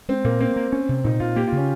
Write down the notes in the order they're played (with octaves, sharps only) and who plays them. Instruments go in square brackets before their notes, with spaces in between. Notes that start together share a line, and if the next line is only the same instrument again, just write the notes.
[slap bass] G#3 [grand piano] C4
[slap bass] A#2 [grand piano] A#3
[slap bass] A#3 [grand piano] C4
[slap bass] A#3
C#4
C3
[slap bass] A#2 [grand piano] D#4
[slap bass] A#2 [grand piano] F4
[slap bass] A#3 [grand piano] G4
[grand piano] F4
[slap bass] C#3 [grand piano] C#4